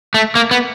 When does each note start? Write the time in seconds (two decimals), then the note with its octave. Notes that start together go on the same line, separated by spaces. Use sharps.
0.14 A3
0.35 A#3
0.51 B3